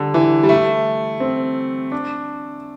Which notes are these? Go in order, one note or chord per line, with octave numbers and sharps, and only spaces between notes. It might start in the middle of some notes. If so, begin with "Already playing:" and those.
Already playing: D3 G3
E3
G3
A3
C4
D4